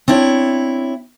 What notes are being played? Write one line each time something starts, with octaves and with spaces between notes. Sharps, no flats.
C4 D4 E4 C#5